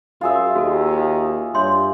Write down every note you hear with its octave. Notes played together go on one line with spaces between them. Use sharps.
F#2 F4 G#4 E5
D#2 F#4 A4
G2 C#5 E5 C6